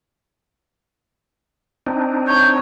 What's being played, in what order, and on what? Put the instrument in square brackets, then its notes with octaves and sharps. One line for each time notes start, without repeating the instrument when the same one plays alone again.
[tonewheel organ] C4 D4 D#4
[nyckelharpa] C#5 [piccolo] G6